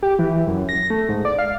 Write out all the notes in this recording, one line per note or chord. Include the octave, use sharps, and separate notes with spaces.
G4
E3
F#2
A#6
A3
G#2
D5
F5